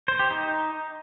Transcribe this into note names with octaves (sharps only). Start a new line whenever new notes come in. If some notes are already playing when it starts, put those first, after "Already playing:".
C5
G4
D#4